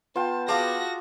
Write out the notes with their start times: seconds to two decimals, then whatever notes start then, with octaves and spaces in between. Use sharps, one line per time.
0.16 B3 F4 G5 A5
0.48 F#4 G#4 D5 F5 A5 C6 A#6